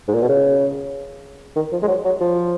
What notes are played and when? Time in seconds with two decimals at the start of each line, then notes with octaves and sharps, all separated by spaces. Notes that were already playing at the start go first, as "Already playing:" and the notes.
0.08 G#2
0.14 A#2
0.22 B2
0.29 C#3
1.56 D#3
1.72 F3
1.82 G#3
1.88 F#3
2.05 F#3
2.21 F3